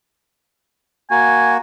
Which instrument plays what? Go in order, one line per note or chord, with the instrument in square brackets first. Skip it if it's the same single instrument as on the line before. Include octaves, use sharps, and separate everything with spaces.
[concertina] A#3 F#4 [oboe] G#5